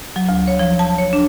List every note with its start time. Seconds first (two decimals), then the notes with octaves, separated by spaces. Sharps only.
0.16 F#3
0.29 D2
0.48 C#5
0.59 F3
0.79 A5
0.98 C#5
1.13 D4